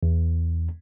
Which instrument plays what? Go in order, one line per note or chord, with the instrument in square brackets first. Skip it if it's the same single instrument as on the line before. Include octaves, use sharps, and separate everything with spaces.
[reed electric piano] E2